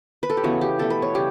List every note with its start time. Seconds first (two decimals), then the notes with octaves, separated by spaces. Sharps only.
0.23 B4
0.30 A4
0.37 G4
0.43 C#3 E3 B3 F#4
0.61 G4
0.79 B2 A3 A4
0.90 B4
1.02 C#5
1.14 C#3 G3 G4